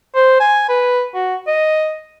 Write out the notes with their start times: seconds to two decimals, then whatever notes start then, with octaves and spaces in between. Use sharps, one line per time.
0.15 C5
0.40 G#5
0.69 B4
1.14 F#4
1.47 D#5